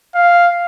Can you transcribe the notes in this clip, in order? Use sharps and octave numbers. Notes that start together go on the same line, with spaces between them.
F5